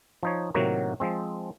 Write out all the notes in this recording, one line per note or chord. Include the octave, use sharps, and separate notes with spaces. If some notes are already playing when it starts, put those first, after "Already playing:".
F3 D#4 C#5
A2 C3 D#3 F#3 A#3 F#4
F3 G#3 C4